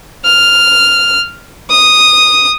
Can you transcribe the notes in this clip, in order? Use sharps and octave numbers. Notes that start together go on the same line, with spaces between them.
F6
D#6